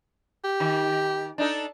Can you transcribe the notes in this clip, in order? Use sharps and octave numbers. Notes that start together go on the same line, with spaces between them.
G4
D#3
D4 D#4 A4